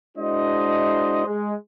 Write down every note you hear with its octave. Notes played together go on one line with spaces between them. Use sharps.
G#3 D4 E4 F#4 C5 D#5
G#3